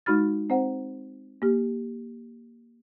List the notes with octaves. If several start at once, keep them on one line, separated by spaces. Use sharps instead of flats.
G#3 D#4 F#4 B5 F6 A6
C4 C5 F#5
A#3 G4